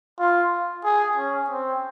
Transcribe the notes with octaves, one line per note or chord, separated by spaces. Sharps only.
F4
G#4
C#4
C4